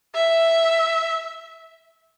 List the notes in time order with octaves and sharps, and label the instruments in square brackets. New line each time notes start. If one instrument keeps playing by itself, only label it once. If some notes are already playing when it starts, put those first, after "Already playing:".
[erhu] E5